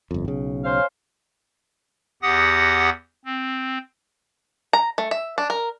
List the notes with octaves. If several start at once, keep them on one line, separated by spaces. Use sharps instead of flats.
G1 F2
B1 C#3
C#4 C5 F5
E2 G4 F#5 D#6 A#6
C4
A#5
A3
E5
D4
A#4